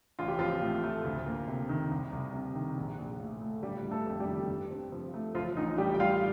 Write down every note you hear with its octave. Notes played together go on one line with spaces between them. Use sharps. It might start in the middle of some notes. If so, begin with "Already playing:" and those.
A1 F4
G4
F3 C4 F4
A2
A3
D2
A#3
C3
D#3
C2
C2
C3
D#3
A#1
A#1
A2
A3
G1 G3 G4
G1
A3 A4
F2
G3 G4
D#3
G2
C4
F3
A3
A1 F3 F4
A1 D#4
A2 G3 G4
G5
G3 F4 F5